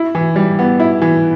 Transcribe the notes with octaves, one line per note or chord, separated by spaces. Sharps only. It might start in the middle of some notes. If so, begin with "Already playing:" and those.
Already playing: E4
E3
G3
B3
E4
E3